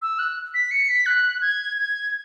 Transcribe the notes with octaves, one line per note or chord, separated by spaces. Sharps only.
E6
F#6
B6
C#7
B6
F#6
G#6
G#6